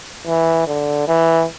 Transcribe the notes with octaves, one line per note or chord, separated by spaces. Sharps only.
E3
D3
E3